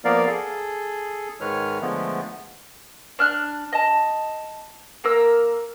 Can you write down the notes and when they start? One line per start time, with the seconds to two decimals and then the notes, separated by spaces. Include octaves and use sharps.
0.05 F3 A#3 B3 A#4 D5 F5
0.27 G#4 A4
1.41 G#2 D#3 G#3 B4 C#5 F6
1.81 D3 F3 G#3 A3 B3
3.19 D4 F6 F#6
3.73 D#5 A5
5.04 A#3 A#4 E6